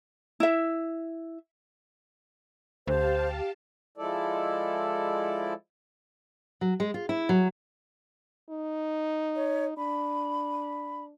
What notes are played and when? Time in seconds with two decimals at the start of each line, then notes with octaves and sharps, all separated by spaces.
0.40 E4 E5
2.87 D2 G4 C5 F5 A5
3.98 F3 G#3 E4 A4 D5
6.61 F#3
6.80 G#3
6.94 F4
7.09 E4
7.29 F#3
8.49 D#4
9.35 C#5
9.77 D4 B5